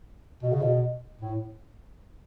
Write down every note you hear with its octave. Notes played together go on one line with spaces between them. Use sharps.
B2
C#3
B2
A2